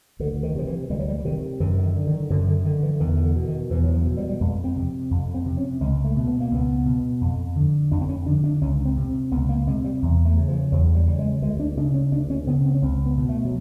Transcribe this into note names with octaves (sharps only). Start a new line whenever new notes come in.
D2 D3
D#3
C3 F3
E3
D2 G3
F#3
G3
C3 D#3
F#2 D#3
D3
D#3
D3
D#3
F#2 D3
D3
D3 D#3
E3
E2 D#3
D#3
D3
B2
D#3
E2 E3
F#3
F3
B2
G3
G3
F2 G#3
C4
C3
F2
C4
C3
C#4
C#2 G#3
A3
B2
B3
A#3
C#2 B3
B2
F2
D3
F2 D4
C4
C#4
D3 D4
D4
C#2 C#4
C4
C3
C#2 B3
A#3
C3 G#3
G3
E2
A3
C#3
F3
E2 F#3
G3
C#3 G3
G#3
D2 G#3
D4
C#3 D4
C#4
D2 D4
C#4
C#3 B3
C4
C#4
C#2 C4
B3
B2
A3
F#3